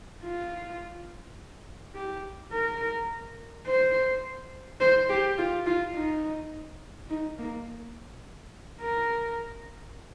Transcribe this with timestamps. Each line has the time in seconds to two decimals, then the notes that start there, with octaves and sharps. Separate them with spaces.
0.24 F4
1.95 G4
2.52 A#4
3.66 C5
4.81 C5
5.09 G4
5.38 F4
5.66 F4
5.95 D#4
7.10 D#4
7.39 A#3
8.81 A#4